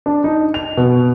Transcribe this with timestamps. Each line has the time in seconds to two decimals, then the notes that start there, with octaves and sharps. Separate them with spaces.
0.06 D4
0.24 D#4
0.54 F7
0.77 B2